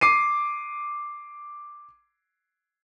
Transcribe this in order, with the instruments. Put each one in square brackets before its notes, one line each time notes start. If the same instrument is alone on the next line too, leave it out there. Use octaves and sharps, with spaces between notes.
[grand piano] D6 C7 D#7